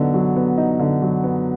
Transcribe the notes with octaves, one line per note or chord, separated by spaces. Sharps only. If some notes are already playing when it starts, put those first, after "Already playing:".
Already playing: D3 F#3 B3 D#4
F#3
B3
D#4
D3
F#3
B3